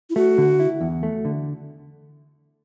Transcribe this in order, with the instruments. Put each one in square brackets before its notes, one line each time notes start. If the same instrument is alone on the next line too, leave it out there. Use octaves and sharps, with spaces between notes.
[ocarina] E4
[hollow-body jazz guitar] A3 [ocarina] F#4
[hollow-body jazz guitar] D3
E4
E2
A3
D3